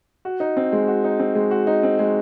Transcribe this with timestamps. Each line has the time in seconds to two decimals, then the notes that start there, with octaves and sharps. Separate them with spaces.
0.25 F#4
0.40 D#4
0.57 C4
0.72 G#3
0.88 F#4
1.04 D#4
1.19 C4
1.35 G#3
1.51 F#4
1.67 D#4
1.83 C4
1.99 G#3